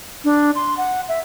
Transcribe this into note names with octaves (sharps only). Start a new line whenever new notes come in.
D4
C6
F#5
E5